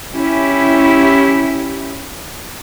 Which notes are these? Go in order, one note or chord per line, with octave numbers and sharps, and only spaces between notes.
C#4 E4 G4